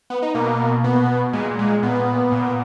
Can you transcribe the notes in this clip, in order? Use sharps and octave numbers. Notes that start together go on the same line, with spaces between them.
B3
D#4
B2 A#3
B2 B3
A#2 G#3
G#3
A#2 B3
A#2